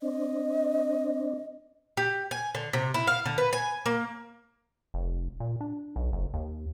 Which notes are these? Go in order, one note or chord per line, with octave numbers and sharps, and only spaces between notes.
C4 D4 D#5
G4
G#5
D3
C3
E4
F5
D3
B4
G#5
A#3
F1
A#2
D4
B1
F#1
D#2